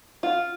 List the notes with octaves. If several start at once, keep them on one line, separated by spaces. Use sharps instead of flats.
F4